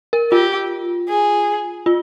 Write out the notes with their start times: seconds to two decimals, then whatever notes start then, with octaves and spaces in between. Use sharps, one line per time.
0.13 A#4
0.32 F4 G4
1.09 G#4
1.86 F4